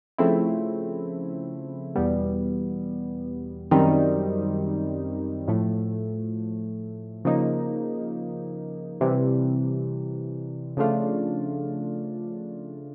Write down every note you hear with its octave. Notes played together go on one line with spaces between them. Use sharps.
C#3 F3 A3 C4 E4
E2 B2 G3 B3
F#2 D#3 G3 C4 D#4
A2 F3 A3
C#3 F3 A#3 D#4
C3 E3 G3
C#3 F3 A3 D4 F4